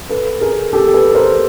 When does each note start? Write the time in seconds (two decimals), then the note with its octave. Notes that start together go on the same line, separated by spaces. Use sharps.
0.09 A4 B4
0.41 G#4 A#4
0.73 G4 A4
0.94 A4 B4
1.15 A#4 C5